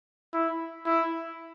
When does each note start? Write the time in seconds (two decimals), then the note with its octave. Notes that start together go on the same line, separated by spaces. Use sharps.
0.34 E4
0.86 E4